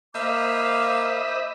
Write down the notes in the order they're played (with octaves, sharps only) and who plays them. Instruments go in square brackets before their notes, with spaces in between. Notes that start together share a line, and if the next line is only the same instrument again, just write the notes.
[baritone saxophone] A#3 [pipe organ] C5 [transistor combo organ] D#5 E5 B5 [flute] D6